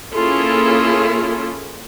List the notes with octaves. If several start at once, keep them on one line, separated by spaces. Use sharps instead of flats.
A#3 C#4 E4 F4 G#4 A4